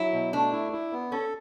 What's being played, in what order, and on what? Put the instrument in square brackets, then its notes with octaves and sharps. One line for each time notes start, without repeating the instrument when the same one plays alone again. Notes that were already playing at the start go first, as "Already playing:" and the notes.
Already playing: [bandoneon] F#3 [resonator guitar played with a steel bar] E4
[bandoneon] B2
[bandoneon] A3 [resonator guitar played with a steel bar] D4
[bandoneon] E4
E4
B3
[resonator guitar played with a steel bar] C#4 [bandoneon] A4